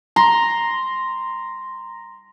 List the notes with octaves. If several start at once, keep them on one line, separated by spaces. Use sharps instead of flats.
A#5 C6